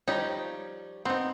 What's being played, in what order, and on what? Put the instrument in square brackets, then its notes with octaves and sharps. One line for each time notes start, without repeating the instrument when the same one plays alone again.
[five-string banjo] F3 G3 C#5 [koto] D#4
[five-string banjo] B3 [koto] C4 D#4